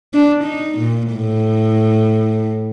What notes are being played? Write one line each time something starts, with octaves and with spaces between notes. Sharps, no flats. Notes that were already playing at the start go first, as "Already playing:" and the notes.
D4
D#4
A#2
A2